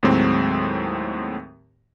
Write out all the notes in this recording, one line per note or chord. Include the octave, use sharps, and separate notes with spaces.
D#2 A2 F#3 G#3 C4